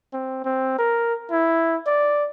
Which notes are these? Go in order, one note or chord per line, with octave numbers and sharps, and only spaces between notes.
C4
C4
A#4
E4
D5